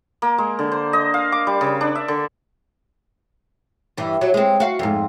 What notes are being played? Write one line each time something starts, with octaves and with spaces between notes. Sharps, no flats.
A#3
G#3
D3
C5
D#5
F5
D6
G3
C#3
D4
E5
D3
G2 E3
F#3
G#3 C4
F#4 F5
F2 G#2